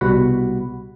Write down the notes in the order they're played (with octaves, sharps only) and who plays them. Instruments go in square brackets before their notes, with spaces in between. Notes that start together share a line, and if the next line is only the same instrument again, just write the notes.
[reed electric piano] C2 B2 G3 F#4 F#5 B5